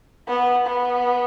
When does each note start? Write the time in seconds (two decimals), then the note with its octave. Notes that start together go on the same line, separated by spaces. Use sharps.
0.28 B3
0.67 B3